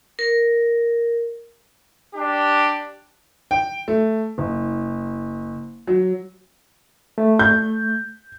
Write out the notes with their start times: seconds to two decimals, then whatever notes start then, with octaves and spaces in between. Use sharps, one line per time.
0.19 A#4
2.15 D4 G4
3.51 G5
3.88 A3
4.38 F#1
5.87 F#3
7.18 A3
7.39 G6